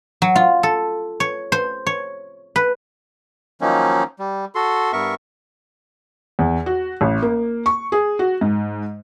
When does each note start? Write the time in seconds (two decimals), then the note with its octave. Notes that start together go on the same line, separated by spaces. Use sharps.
0.22 F#3
0.36 F4
0.63 A4
1.20 C#5
1.52 C5
1.86 C#5
2.56 B4
3.61 D#3 F3 F#3 A#3 C#4 D#4
4.19 G3
4.55 F#4 A4 C6
4.93 G2 B3 A#4 E5 C#6
6.39 E2
6.66 F#4
7.01 A1
7.22 A#3
7.66 C#6
7.92 G#4
8.19 F#4
8.41 G#2